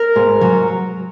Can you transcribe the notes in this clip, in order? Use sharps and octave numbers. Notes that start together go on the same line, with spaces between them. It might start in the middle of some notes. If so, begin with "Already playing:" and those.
Already playing: A#4
G#2
F#3